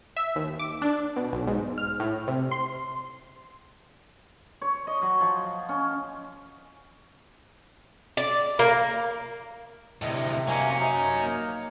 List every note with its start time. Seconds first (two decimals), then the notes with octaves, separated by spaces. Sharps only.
0.16 E5
0.36 D#2
0.59 D6
0.82 D4
1.16 B2
1.32 B1
1.47 G#2
1.78 F6
2.00 A2
2.28 C3
2.51 C6
4.61 C#5
4.87 D#5
5.02 F#3
5.21 F3
5.69 C#4
8.17 D5
8.59 A#3
10.02 D2 A2 C3 D#5
10.48 F#3 A#3 C#4 G#5
10.80 D#4 A#5
11.18 A#3